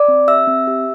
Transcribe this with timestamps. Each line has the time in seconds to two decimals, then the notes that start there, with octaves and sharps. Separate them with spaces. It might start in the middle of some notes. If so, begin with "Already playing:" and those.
Already playing: D5 D6
0.08 C4
0.28 G4 E5 E6
0.47 C4
0.67 G4